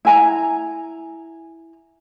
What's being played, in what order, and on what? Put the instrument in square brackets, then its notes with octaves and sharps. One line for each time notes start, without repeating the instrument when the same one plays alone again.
[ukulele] E4 G#5 A#5